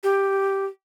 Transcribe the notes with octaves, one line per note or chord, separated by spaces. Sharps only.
G4